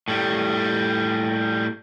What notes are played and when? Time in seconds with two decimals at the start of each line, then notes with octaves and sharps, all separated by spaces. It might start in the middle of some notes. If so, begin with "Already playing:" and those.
0.08 A2 G3